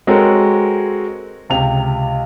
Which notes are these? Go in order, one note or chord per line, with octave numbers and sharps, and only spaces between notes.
G#3 C4 F#4 A4 A#4 C#5
C#2 C3 F7